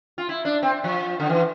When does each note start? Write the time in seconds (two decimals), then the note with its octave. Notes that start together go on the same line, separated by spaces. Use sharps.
0.18 F4
0.29 E4
0.45 D4
0.63 C4
0.84 F3
1.20 D3
1.30 E3